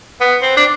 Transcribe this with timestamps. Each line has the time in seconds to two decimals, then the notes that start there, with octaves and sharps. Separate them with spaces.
0.21 B3
0.42 C4
0.57 D4